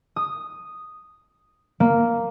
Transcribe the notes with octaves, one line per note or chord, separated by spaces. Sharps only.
D#6
A#3